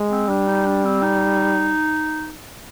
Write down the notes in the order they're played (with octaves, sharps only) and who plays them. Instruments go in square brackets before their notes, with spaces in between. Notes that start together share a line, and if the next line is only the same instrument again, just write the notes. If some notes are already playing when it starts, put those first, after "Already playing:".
Already playing: [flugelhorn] G#3
[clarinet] C4
[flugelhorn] G3 [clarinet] D4
[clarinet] D#4
D4
C4
D#4